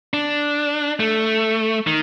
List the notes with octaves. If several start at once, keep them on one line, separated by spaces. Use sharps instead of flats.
D4
A3
D#3